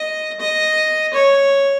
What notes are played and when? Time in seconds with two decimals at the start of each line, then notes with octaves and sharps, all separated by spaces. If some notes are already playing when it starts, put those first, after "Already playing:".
Already playing: D#5
0.40 D#5
1.13 C#5